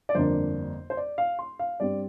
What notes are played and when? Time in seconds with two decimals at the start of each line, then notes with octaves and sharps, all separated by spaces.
0.09 D5
0.15 G1 F2 D3 A#3 D4 C5
0.90 C5
0.97 D5
1.18 F5
1.39 C6
1.59 F5
1.80 G2 G3 C4 D5